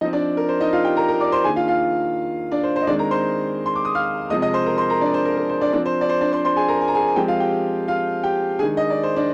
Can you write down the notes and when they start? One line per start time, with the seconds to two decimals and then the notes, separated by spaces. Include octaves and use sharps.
0.01 F3 C4 D#4 D#5
0.13 D4 D5
0.37 A#4
0.49 C5
0.60 D#4 D#5
0.73 F4 F5
0.85 G4 G5
0.97 A#4 A#5
1.08 A#4 A#5
1.20 D5 D6
1.32 C5 C6
1.44 D#3 A#3 D4 G#4 G#5
1.56 F4 F5
1.68 F4 F5
2.52 D4 D5
2.64 C5
2.76 C5
2.82 D#5
2.87 D#3 G#3 C4 D4 D5
2.99 A#4 A#5
3.11 C5 C6
3.66 C6
3.75 D6
3.85 D#6
3.95 F5 F6
4.30 C3 F3 G#3 D#5 D#6
4.42 D#5 D#6
4.54 C5 C6
4.66 A#4 A#5
4.78 C5 C6
4.90 A#4 A#5
5.01 D4 D5
5.14 C5
5.25 A#4
5.37 A#4
5.49 C5
5.61 D4 D5
5.73 F3 C4 D4 D5
5.86 C5
6.01 D5
6.09 C5
6.21 D4 D5
6.33 C5 C6
6.45 C5 C6
6.56 G#4 G#5
6.68 A#4 A#5
6.81 G#5
6.88 A#5
6.94 G#4 G#5
7.07 G#5
7.16 F3 G#3 C4 G4 G5
7.28 F4 F5
7.40 G4 G5
7.88 F4 F5
8.23 G4 G5
8.59 D#3 G#3 D4 G#4 G#5
8.77 D#5
8.90 D5
9.03 C5
9.16 D4 D5